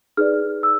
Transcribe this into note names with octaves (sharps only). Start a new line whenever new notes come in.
D#4 G#4 B4 D5 F6
E6